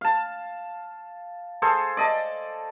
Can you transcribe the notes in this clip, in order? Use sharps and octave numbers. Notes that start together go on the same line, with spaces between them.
F5 A5
G#4 A4 C5
D5 D#5 A5